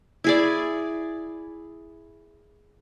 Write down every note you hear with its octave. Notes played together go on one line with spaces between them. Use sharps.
E4 G#4 D5